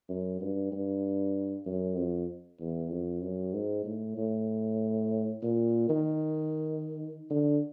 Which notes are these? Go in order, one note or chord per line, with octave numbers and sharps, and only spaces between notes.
F#2
G2
G2
F#2
F2
E2
F2
F#2
G#2
A2
A2
A#2
D#3
D3